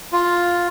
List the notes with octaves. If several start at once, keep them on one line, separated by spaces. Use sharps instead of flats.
F4